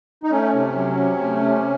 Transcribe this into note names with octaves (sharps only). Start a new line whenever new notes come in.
D#4
A3 C#4
C3
F#3
C3
A3
C3